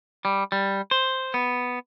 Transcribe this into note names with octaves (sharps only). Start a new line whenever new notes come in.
G3
G3
C5
B3